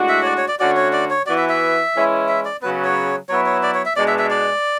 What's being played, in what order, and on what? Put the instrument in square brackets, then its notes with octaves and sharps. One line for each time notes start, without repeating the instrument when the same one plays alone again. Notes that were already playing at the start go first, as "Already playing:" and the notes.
Already playing: [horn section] A2 G#3 D4 F#4
[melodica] E5
C#5
D5
C#5
D5
[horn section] D3 A3 C#4 F#4 [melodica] D5
[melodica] C#5
D5
C#5
[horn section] E3 B3 F#4 [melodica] D5
[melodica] E5
E5
[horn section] E3 G#3 C#4 E4
[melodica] E5
D5
[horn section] C#3 F#3 B3 [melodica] B4
[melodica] C#5
[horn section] F#3 B3 E4 [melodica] C#5
[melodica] C#5
D5
C#5
E5
[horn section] B2 G#3 D4 [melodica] D5
[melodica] E5
E5
D5